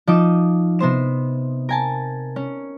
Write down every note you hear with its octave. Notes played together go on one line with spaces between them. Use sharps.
F3 D#4 D#5 D6 E7
C3 B3 C5 E7
A#4 G#5 A5
C#4